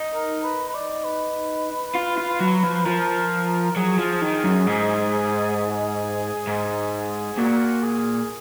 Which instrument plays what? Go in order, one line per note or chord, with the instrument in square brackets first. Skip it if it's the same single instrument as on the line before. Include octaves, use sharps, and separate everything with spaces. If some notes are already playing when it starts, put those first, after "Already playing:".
Already playing: [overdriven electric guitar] D#4
[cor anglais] A#4
B4
B4
D5
B4
[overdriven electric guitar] F4
F4
F#3
F3
[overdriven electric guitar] F3 [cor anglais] A#4
[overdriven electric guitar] F#3 [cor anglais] G#4
[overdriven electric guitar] F3
D#3
F#2
G#2
[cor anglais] G#4
[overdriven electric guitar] G#2
[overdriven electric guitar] A#2 [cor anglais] F#4
[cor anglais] G#4